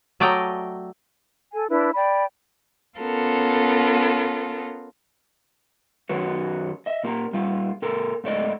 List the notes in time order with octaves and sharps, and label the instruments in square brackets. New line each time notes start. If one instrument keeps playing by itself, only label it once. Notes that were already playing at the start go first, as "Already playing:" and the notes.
[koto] F#3 A3 D5 D#5 G5 A#5
[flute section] A4 G#5
D4 E4 B4
D5 G5 B5
[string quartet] B3 C#4 F4 A4 A#4
[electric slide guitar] F#2 D#3 F#3 F#4 B4
D#5 E5
A#2 A#3 G4 A#5
A#2 G3 F4
A#2 A4 A#4
G#2 A3 D5 D#5